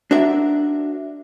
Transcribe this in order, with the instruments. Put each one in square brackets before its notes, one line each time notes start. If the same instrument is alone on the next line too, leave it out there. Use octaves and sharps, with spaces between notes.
[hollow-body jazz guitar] D4 F#4 A#4 E5